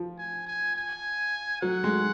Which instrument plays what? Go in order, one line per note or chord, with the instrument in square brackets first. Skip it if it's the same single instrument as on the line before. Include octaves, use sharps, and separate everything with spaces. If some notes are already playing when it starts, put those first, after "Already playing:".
Already playing: [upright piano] F3
[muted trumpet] G#5
G#5
G#5
[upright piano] F#3 [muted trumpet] F#5
[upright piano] G#3